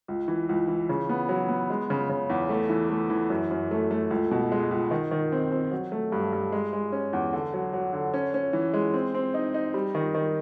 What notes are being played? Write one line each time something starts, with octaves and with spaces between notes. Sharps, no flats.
C#2
E3
C#2
E3
C#3
B3
F#3
B3
G#3
C#3
C#3
E2
A3
E3
A3
E3
F#2
F#2
A3
A3
C#2
B2
G#3
C#2
D#3
D#3
C4
C4
F#3
A3
G2
G2
G#3
G#3
C#4
E2
D3
F#3
F#3
D3
C#4
C#4
E3
G#3
C4
C4
D#4
D#4
G3
D#3
D#3